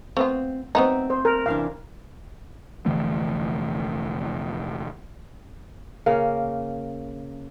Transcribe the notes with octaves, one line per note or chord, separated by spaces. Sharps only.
A3 B3 C4 F4
F#3 A3 B3 C4 D#4
C5
A#4
C3 E3 D4 F5
F1 D3 E3 A3
C#3 A#3